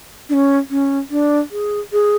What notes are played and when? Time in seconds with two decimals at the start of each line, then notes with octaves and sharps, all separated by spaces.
0.29 D4
0.34 C#4
0.70 C#4
1.10 D4
1.51 G#4
1.92 G#4